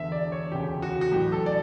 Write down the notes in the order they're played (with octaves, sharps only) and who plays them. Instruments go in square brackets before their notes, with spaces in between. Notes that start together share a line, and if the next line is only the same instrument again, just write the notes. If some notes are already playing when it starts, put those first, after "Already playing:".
Already playing: [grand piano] E1 E2 D3 E5
D5
C#5
E1 D2 C#3 G4
F#4
F#4
A1 A2 F#3 G4
A4
D5